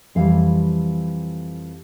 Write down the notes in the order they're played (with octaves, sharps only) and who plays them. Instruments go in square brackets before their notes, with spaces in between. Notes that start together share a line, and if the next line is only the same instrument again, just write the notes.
[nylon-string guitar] F2 E3 G3 F5